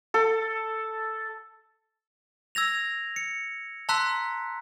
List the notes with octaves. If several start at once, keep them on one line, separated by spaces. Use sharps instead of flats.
A4
E6 G#6 A#6 F7
C#7
A5 A#5 C6 E6 F#6 B6